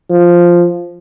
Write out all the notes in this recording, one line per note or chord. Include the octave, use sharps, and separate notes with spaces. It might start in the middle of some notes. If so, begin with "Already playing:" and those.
F3